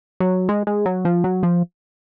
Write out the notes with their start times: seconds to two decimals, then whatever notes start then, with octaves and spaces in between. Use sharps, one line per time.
0.20 F#3
0.49 G#3
0.67 G#3
0.86 F#3
1.05 F3
1.24 F#3
1.43 F3